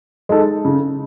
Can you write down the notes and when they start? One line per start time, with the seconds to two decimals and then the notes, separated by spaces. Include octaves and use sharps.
0.29 G#3 D#4 A4
0.65 C#3